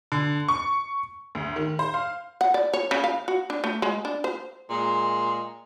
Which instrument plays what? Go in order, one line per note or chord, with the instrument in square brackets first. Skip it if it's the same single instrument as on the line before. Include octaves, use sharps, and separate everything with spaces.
[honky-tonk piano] D3
C#6
D2
D#3
C5
F5
[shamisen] F#5
D5
C#5
C#3
F5
F#4
D4
A3
G#3
D4
C5
[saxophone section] A#2 G#3